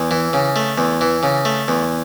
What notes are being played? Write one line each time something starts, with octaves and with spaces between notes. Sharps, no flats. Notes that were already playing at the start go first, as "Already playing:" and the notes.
Already playing: E2
E3
C#3
A3
E2
E3
C#3
A3
E2